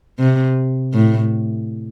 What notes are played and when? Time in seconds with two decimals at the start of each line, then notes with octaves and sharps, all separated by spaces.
0.19 C3
0.94 A2